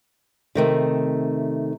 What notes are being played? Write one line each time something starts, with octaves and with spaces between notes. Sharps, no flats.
C3 D#3 A3